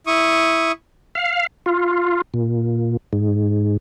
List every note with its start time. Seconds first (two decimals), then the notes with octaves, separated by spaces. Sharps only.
0.07 E4 C#6 D#6
1.15 F5
1.66 F4
2.34 A#2
3.13 G#2